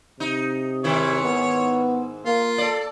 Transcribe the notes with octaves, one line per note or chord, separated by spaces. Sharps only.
C3 D#4
G#2 D#3 E4 C#5
B3
A#3 F4
A4 D5